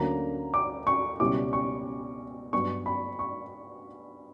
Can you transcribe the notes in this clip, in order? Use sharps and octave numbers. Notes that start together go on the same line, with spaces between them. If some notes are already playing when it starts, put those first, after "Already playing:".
Already playing: D2 D3 F#3 A#3 C#4 A#5
D6
C#6
C#2 B2 G3 C#4 E4 D6
C#6
G2 F#3 B3 D4 C#6
B5
C#6